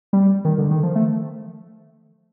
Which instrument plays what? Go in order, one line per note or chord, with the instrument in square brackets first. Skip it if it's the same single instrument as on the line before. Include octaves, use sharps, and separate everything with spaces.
[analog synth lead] G3
D#3
D3
D#3
F3
A3